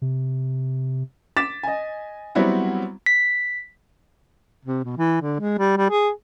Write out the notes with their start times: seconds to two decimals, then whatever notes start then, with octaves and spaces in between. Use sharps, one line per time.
0.02 C3
1.37 D6 A6 B6 E7
1.63 D#5 G#5
2.35 F#3 G3 B3 C4 E4 F#4
3.06 B6
4.65 C3
4.85 B2
4.97 E3
5.21 D3
5.40 G#3
5.58 G3
5.77 G3
5.90 G#4